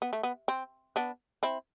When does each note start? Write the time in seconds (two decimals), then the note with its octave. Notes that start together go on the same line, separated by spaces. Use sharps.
0.02 B3
0.13 A3
0.23 B3
0.48 C4
0.96 B3 D4
1.43 C4 E4